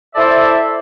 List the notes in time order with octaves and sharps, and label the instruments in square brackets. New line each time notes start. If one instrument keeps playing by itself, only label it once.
[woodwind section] E4 A4 C5 D5 E5 A5